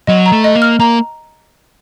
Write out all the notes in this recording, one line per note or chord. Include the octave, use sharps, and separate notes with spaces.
F#3 D#5
A#5
A3
D#5
A#3
F6
A#3 A#5